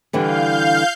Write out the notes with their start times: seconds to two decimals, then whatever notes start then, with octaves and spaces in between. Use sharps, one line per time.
0.13 D3 E3 G3 F5 G6